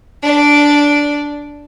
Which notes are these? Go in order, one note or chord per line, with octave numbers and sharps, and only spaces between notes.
D4 D5